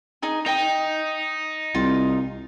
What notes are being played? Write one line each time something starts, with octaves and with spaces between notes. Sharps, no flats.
D#4 G#4 G#5
D#4 G5 D#6
C2 F4